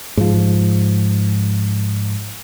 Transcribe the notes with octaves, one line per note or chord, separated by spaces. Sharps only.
G#2 F3